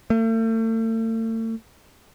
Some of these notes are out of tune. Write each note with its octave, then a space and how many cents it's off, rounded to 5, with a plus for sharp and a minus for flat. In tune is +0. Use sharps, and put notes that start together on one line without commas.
A3 +40